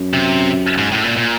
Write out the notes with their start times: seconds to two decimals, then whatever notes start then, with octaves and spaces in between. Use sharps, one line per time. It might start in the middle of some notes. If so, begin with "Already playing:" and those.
Already playing: F#2
0.14 C3
0.78 G#2
0.92 A2
1.04 A#2
1.17 A#2